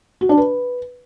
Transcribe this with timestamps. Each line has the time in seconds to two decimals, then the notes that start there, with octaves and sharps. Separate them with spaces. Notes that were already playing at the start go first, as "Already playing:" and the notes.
0.21 F#4
0.29 D4
0.37 B4